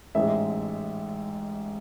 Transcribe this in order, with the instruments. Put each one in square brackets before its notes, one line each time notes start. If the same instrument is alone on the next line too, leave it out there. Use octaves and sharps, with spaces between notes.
[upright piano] A1 G#2 G#3 E5